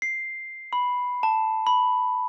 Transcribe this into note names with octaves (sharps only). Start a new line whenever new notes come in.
C7
B5
A5
B5